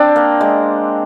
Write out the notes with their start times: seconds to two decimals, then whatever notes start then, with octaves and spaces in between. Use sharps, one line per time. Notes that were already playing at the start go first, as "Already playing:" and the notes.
Already playing: C4 D4
0.16 A#3
0.41 G#3